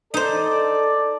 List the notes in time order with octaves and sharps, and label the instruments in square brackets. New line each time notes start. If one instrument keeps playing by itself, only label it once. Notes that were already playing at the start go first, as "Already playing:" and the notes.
[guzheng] D#4 C5 [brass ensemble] A4 D5